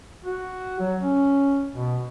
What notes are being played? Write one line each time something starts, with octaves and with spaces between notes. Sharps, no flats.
F#4
F#3
C#4
B2